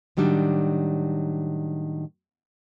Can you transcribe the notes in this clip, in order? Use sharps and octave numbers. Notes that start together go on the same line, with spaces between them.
A2 D#3 F#3 G3 D4